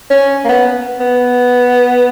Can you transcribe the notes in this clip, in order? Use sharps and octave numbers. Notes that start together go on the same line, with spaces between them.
C#4
A#3
B3
B3